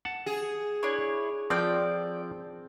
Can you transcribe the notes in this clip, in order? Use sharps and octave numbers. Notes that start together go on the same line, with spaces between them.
F#5 A5
G#4
D4 E4 C#5
F3 C4 D5 G5